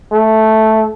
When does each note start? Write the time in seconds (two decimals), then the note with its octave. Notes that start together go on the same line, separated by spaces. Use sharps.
0.11 A3